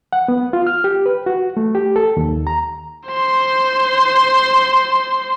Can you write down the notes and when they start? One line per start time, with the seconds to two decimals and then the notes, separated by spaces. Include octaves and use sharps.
0.13 F#5
0.28 B3
0.53 F4
0.67 F6
0.84 G4
1.06 B4
1.26 F#4
1.57 A3
1.75 G4
1.96 A4
2.17 D#2
2.47 A#5
3.10 C5 C6